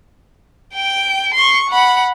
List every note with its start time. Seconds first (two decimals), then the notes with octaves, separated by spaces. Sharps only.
0.74 G5 D7
1.34 C6 C#6
1.70 F#5 B5